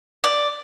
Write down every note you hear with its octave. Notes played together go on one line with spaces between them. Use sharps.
D5